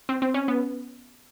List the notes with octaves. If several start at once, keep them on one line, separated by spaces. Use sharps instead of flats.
C4
C4
C#4
B3